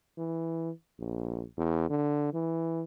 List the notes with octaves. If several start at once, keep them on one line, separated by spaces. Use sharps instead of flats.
E3
A#1
E2
D3
E3